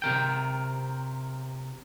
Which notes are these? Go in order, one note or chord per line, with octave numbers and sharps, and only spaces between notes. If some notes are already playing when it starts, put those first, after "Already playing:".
C3 A#4 G5